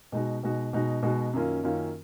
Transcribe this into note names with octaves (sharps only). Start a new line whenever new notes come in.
B2 G#3 D#4 F#4
B2 G#3 D#4 F#4
B2 G#3 D#4 F#4
B2 G#3 D#4 F#4
F#2 D#3 A#3 C#4 F4
F#2 D#3 A#3 C#4 F4